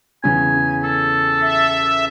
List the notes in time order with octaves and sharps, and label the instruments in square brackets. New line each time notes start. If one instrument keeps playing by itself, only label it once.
[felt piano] E2 C#3 C#4 [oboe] G#5
[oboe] A4
[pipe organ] E5